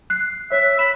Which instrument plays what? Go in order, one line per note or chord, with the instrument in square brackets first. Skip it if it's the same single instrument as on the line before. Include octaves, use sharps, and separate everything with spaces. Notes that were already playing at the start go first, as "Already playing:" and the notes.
[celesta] F#6 C7
[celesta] C#5 F#6 [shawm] E5
[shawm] B5 [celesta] E7